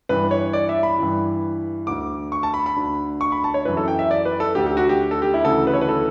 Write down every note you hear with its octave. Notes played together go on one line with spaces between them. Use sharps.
G2 E3 B4
C#5
D5
E5
B5
G2 E3
D2 D3 D6
C#6
A5
B5
B5
D2 D3
C#6
B5
A5
C#5
F#2 E3 B4
A4
G5
E5
D5
B4
A4
D2 D3 G4
G4
F#4
G4
A4
G4
E4
D2 C#3 E3 A4
B4
C#5
B4
A4